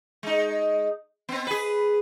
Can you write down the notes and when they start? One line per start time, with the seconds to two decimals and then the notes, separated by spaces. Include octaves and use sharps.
0.23 G#3 D#4
1.29 B3 C4
1.47 G#4 B4